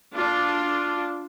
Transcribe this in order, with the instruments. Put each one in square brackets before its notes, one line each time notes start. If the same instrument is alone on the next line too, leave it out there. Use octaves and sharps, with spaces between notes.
[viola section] D4 F4